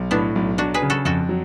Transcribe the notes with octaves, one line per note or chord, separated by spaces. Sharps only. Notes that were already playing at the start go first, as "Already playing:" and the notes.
Already playing: B1
A2 B3 D4
B1
F#3 D4 F#4
G#4 B4
C#3
F#4 A4
F2 F#4 A4
F#3